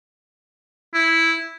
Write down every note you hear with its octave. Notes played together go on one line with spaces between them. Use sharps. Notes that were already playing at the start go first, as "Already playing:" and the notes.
E4